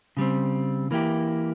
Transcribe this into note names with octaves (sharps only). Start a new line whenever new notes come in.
C#3 G3 C4
E3 A#3 E4 G4